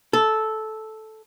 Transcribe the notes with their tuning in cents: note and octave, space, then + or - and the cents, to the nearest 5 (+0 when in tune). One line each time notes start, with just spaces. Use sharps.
A4 -10